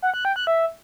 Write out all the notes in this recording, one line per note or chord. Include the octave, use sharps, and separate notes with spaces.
F#5
F#6
G5
F#6
E5